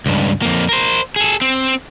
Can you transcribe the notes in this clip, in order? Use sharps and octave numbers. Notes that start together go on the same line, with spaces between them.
C#2 G2
F2 A#3
A#4 C5
G#4 A4
C4